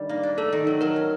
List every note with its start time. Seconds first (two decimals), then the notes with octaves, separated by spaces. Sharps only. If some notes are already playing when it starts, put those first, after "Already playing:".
Already playing: D3 D#3 G3
0.09 A#3
0.23 D4
0.38 A3 A4
0.52 D#3
0.67 F#3
0.81 F#3 A#4
0.96 C#4